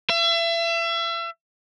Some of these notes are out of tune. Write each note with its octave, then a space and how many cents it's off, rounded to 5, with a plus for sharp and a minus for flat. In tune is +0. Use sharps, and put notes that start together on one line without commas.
E5 +35